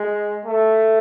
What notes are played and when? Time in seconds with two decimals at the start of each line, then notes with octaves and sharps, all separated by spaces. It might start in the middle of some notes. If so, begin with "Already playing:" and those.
Already playing: G#3
0.45 A3